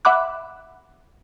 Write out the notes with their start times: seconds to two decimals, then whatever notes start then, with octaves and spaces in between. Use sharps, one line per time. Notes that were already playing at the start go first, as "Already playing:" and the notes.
0.05 E5 F#5 B5 D6 F#6